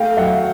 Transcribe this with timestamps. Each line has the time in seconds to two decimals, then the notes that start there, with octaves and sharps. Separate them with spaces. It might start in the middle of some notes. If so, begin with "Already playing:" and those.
Already playing: A3 F5 G5
0.17 F#3 E5 F#5